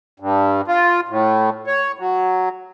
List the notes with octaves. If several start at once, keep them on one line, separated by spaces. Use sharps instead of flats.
G2
F4
A2
C#5
F#3